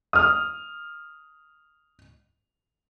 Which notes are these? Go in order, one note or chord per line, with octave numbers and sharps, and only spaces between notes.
D#6 F6